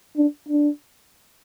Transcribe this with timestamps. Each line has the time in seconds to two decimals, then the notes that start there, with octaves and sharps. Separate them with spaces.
0.16 D4
0.49 D4